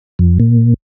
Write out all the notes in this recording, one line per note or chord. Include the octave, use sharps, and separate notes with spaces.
F2
A#2